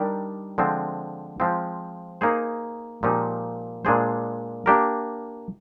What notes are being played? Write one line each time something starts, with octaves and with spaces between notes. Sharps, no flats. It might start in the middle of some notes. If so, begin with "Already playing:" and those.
Already playing: D#3 G3 D4 G4 A#4
D3 F3 G#3 C4
F3 G#3 C4 F4
A#3 D#4 G#4 C5
A#2 F3 G#3 D#4 G4
A#2 G#3 D4 G#4 C5
A#3 D4 G4 A#4